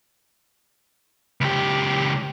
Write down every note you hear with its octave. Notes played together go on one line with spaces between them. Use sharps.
C#2 G4